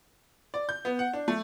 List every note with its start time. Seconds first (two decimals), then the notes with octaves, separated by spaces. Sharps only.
0.54 D5
0.69 G6
0.85 B3
0.99 F#5
1.13 D4
1.28 A3